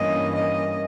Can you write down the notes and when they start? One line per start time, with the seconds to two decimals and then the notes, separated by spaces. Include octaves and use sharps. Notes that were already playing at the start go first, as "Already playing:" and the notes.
Already playing: G2 E3 A#3 C#4 D#5
0.35 D#5